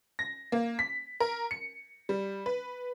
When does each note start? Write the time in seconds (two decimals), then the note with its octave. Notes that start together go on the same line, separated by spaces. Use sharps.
0.19 A#6
0.52 A#3
0.79 B6
1.20 A#4
1.51 C#7
2.09 G3
2.46 B4